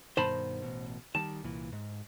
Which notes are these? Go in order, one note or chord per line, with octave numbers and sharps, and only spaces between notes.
G2 B2 D#3 C5 A5 B5
A1 B2
D#3 G3 A5
C2 A#2 E3
G#2